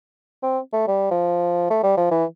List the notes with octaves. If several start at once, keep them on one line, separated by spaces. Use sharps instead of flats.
C4
A3
G3
F3
A3
G3
F3
E3